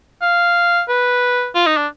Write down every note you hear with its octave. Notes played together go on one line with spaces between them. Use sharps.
F5
B4
F4
D#4
D4